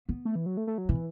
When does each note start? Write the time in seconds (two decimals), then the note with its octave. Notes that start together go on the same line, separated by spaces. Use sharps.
0.09 B3
0.25 A3
0.36 E3
0.46 F#3
0.57 A3
0.67 A3
0.78 F#3
0.89 B2 E3